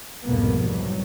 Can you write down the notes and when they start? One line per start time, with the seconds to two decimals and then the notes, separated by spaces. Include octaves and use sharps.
0.25 C2 F2 G#2 B2 A#3 B3
0.58 C2 F#3